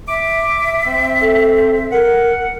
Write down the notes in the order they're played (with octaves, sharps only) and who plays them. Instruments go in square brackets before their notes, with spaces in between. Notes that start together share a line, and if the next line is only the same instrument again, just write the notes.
[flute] E5 [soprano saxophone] D6
[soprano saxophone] C4
[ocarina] A4
[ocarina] A#4 [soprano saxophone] F#5